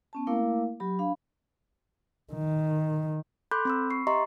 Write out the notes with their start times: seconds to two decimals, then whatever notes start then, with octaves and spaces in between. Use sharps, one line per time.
0.13 B3 C#4 A5
0.27 A3 A#3 E4 A#4 F5 D6
0.80 F#3 G4 B5
0.99 D4 F5 B5
2.33 D#3
3.51 A4 B5 C6 D6 F#6 G6
3.65 C4 B5 E6
3.90 C#6 C7
4.07 G4 D#5 E5 A#5 C6 C#6